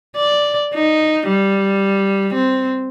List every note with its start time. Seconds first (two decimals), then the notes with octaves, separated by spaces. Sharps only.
0.16 D5
0.74 D#4
1.28 G3
2.34 C4